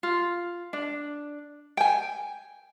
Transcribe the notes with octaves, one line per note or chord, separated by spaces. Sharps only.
F4
D4
G5 G#5